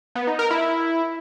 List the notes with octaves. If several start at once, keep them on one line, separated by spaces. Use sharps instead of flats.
B3
D#4
A#4
E4